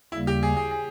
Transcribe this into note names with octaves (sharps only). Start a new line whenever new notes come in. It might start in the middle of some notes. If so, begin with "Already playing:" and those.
D#2 C#3 G3 A#3 E4
G4
G#4
G#4
G#4